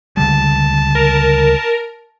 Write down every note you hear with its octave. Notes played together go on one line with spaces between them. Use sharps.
C#2 D3 G3 A5
A#4